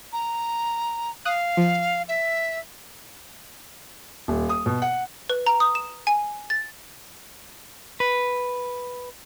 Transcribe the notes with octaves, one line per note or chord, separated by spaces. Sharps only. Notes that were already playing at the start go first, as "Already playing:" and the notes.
A#5
F5 D#6 F#6
F3
E5
D#1
D#6
B2
F#5
B4
A#5
D#6
E7
G#5
A6
B4